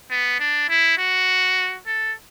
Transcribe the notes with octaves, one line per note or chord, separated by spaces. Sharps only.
B3
D4
E4
F#4
A4